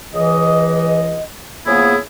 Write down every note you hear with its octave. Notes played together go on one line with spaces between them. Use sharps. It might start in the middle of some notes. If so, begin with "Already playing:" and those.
C#2 E3 D#5
C#3 F3 A#3 B3 E4 G#4